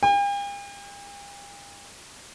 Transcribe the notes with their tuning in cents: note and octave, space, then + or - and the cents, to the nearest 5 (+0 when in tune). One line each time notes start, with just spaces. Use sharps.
G5 +45